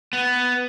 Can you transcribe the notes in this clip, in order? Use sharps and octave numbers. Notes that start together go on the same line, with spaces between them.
B3